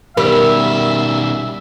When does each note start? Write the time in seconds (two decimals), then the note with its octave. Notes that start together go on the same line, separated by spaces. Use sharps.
0.17 B2 D#3 G3 A#4 E5